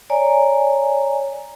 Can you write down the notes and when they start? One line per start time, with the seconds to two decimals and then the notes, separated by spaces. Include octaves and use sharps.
0.10 C#5 D5 G#5 A#5